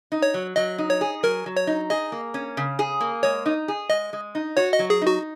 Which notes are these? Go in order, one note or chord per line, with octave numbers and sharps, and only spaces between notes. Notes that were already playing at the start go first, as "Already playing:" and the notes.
D#4
C#5
F#3
F#3 D#5
D#4
C#5
G#4
F#3 A#4
F#3
C#5
D#4
G#4 D#5
A#3
C#4
C#3
G#4
A#3
G#3 C#5
D#4
G#4
G#3 D#5
G#3
D#4
F#4 C#5
D#5
F#3
G#4
D#4
F#4